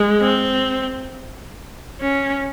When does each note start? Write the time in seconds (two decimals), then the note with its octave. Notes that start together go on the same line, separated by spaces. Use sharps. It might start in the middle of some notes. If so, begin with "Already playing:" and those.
Already playing: G#3
0.21 C4
2.01 C#4